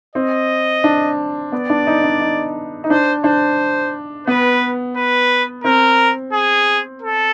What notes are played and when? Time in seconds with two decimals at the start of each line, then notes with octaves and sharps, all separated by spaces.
0.15 C4 D#5
0.84 D4
1.52 B3 D5
1.70 D4
1.87 D#4
2.04 D4
2.21 D#4
2.84 D#4
2.90 D4 C5
3.24 D4 C5
4.27 B3 B4
4.96 B4
5.64 C4 A#4
6.33 G#4
7.02 A4